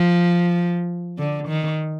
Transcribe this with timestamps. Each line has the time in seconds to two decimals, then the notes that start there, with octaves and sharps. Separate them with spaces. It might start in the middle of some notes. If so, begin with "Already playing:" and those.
Already playing: F3
1.18 D3
1.48 D#3